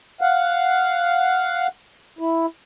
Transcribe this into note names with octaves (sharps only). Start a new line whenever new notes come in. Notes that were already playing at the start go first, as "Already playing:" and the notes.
F5 F#5
E4